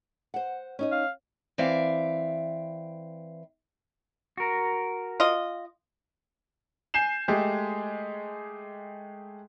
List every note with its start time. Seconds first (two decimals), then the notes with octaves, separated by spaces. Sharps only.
0.34 C5 F#5
0.79 C#4 D#4 D#5
0.92 F5
1.58 E3 C4 D5 E5 F5
4.37 F#4 A#4
5.20 F4 D#5
6.94 G#5 G6 C7 E7
7.28 G#3 A3 G4 G#4